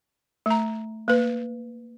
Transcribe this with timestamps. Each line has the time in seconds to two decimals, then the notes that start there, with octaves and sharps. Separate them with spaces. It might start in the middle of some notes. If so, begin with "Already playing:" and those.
0.46 A3 A#5
1.08 A#3 B4